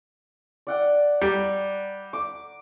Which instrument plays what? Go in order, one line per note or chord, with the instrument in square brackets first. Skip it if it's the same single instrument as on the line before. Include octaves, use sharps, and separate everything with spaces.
[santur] D5 F#5 G5
[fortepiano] G3 [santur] A#5
[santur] D6